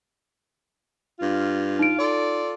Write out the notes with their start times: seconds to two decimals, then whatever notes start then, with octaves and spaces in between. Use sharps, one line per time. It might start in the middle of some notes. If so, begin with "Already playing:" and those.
1.20 G2 F4
1.79 D#4 D7
1.98 F4 A4 D5